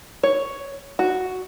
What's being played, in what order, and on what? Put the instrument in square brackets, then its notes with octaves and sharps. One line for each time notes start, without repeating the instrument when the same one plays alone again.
[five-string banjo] C#5
F#4